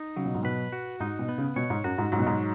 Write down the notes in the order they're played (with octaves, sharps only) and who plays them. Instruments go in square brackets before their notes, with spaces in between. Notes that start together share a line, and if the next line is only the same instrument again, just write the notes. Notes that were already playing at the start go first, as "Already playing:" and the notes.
Already playing: [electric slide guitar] D#4
[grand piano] C#3 [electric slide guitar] F#3
[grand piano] B2
G#2
[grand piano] B2 [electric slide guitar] B4
[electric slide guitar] F#4
[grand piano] G#2 [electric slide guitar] D#4
[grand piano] B2
[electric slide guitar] B3
[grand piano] C#3
[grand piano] B2 [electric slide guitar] C#5
[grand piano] G#2
[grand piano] F#2 [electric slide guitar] F#4
[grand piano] G#2
[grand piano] G#2 [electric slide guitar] F#3
[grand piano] B2
G#2